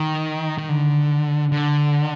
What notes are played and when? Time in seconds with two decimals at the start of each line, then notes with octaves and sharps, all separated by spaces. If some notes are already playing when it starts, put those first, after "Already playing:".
Already playing: D#3
0.58 D#3
0.69 D3
1.52 D3